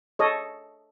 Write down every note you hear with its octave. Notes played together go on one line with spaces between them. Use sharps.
A4 C#5 D#5